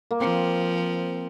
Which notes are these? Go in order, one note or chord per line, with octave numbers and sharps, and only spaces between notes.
A#3
F3 C4